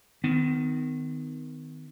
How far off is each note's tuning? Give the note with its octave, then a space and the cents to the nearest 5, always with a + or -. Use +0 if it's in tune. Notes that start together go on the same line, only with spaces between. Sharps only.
D#3 +0 B3 +40